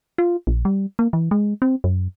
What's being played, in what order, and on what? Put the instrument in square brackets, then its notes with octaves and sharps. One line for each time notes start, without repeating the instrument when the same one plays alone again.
[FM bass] F4
A#1
G3
A#3
E3
G#3
C4
F#2